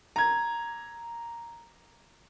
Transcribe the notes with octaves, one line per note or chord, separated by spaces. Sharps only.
A#5 G#6